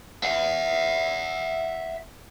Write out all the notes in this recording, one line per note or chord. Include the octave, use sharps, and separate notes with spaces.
E5 F#5